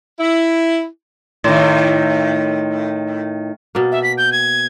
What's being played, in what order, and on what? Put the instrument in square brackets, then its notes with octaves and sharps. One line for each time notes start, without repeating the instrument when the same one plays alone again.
[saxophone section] E4
[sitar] A2 D#3
[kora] B2 A#3
[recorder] E5
B6
G6
G#6